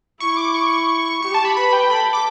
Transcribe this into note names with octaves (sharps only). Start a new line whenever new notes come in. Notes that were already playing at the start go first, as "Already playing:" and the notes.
E4 C#6
D6
C#6
G4 C#6
A5
B5
B4 B5
G5
A4 B5
D6